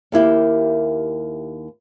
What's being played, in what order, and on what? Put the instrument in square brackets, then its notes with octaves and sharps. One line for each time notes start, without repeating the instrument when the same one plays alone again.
[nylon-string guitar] D#2 A#3 E4 G4